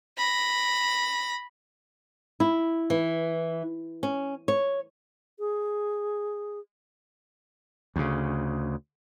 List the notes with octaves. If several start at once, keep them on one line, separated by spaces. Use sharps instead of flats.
B5 A#6
E4
E3
C#4
C#5
G#4
D2 C#3